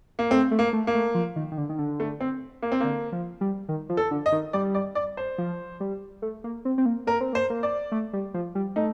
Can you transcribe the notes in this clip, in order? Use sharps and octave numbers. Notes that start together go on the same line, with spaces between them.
A#3
A3 C4
A3
A#3
A3
A#3
A3
F3
D#3
D#3
D3
D#3
D3
A3
C4
A#3
C4
D3 A#3
F3
G3
D#3
F3
A4
D3
D#5
D#3
G3 D5
D5
D5
C5
F3
G3
A3
A#3
C4
C4
A#3
A#3 A#4
C4
A#3 C5
A#3
D5
A3
G3
F3
G3
A3 D#4